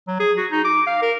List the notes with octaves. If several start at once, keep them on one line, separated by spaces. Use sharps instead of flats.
F#3
G#4
F#4
D#4
D6
F5
A#4